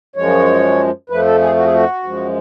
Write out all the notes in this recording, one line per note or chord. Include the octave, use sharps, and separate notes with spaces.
F#2 F3 G#3 C#5
F2 F3 A3 B4
A4
G#4
F#4
G#4
F#4
F#2 F3 G#3